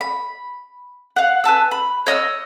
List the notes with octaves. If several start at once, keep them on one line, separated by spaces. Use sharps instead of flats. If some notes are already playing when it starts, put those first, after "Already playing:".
B5
F5 F#5
B4 G#5 A5 E6
B5
C#5 D#5 E6 F6